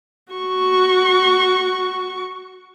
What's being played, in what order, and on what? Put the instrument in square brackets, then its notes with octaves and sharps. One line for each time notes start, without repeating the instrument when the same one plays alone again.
[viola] F#4 C#6